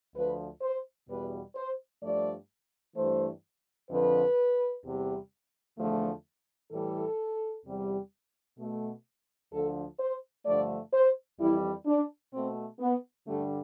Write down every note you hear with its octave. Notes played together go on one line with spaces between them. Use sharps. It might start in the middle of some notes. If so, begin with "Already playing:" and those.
D2 D3 F3 B4
C5
E2 B2 G3 B4
C5
G2 F3 A3 D5
G2 E3 A3 C5
F2 D3 F3 B4
E2 C3 G3
E2 D3 F3 A3
A2 E3 G3 A4
E2 C3 G3
B2 A3
D2 D3 F3 A4
C5
G2 D3 F3 A3 D5
C5
F2 E3 G3 E4
D4
B2 A3 C4
B3
G2 D3 G3 A3